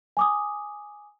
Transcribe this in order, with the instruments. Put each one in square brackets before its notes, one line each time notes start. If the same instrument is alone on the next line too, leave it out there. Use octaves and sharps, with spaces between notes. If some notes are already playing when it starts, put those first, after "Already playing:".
[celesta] G#5 D6 D#6